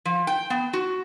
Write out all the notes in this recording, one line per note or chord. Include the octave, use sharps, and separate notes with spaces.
F3
G5
B3
F#4